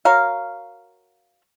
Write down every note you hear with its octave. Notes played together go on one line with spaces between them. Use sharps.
F#4 A#4 C#5 F5